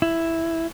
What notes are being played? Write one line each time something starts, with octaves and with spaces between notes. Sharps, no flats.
E4